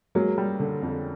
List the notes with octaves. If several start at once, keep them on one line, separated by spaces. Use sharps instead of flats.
F#3 G#3 A#3
G3
D3
F2